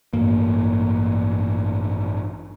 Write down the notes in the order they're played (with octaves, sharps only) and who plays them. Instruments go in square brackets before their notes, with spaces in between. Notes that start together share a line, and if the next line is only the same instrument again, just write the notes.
[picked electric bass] A1 G2 A#3